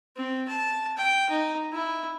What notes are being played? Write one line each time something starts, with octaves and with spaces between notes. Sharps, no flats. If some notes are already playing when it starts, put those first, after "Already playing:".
C4
A5
G5
D#4
E4